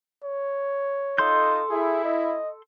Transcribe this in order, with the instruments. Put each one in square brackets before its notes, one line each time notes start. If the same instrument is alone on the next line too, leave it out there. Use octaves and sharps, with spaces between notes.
[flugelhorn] C#5
[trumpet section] D#4 F4 D#5 [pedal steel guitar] A4 C6 G6
[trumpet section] E4 [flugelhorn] G#4
[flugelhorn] D#5